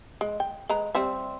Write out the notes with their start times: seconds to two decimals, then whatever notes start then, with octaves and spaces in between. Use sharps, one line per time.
0.21 G#3
0.40 G5
0.69 G#3 B4 A#5
0.95 G3 C4 E5